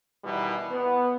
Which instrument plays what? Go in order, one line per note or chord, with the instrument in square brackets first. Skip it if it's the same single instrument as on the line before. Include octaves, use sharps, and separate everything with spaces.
[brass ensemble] B2 D#3 E3 G3 E4
B3